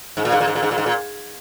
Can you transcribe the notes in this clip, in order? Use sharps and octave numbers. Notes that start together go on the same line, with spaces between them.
G#2
A#2
G#2
A#2
G#2
A#2
G#2
A#2
G#2
A#2